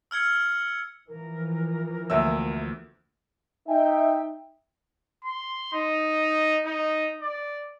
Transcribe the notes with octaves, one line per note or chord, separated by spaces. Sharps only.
E6 F6 G#6 C#7
E3 F3 A#4
D2 A#3 E5 E6
D#4 E5 G5
C6
D#4
D#4
D5